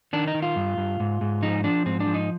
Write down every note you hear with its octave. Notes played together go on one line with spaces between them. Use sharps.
D#3 D4
D#4
D#3
F4
G2
G2
G#2
G#2
F3 D#4
F3 D4
G#2 C4
D4
F3
D#4